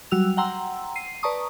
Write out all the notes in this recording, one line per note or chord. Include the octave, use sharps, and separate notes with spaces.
F#3 G3 F#4 E6 F7
F#5 G5 A#5 C6 E6
C7 D#7
B4 D5 A5 A#5 C#6 D#6